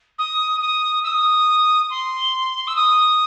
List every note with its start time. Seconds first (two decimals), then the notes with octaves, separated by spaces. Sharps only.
0.18 D#6
0.61 D#6
1.04 E6
1.08 D#6
1.90 C6
2.67 E6
2.76 D#6